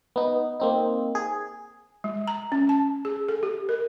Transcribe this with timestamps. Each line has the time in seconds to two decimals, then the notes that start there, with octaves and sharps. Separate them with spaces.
0.16 B3 D#4
0.60 A#3 C4 D#4
1.15 G#4
2.04 G#3
2.27 A#5
2.52 C#4
2.69 A5
3.05 G#4
3.29 A4
3.43 G4
3.69 A#4